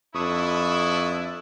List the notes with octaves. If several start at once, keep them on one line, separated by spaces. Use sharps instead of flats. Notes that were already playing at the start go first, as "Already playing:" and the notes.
F2 D4 E4 C#6 D#6